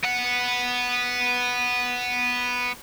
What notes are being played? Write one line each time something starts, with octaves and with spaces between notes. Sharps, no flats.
B3 F#5